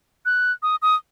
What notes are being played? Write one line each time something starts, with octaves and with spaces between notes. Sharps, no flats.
F#6
D#6
D#6